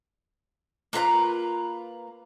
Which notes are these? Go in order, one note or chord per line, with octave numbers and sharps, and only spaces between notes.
A#3 F4 B4 A#5